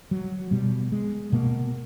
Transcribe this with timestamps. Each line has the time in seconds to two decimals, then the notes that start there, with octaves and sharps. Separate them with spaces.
0.11 F#3
0.51 B2 G3
0.92 G#3
1.32 B2 A#3